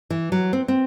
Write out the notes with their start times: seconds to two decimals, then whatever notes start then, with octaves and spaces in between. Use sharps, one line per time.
0.10 E3
0.32 F#3
0.53 C4
0.68 C4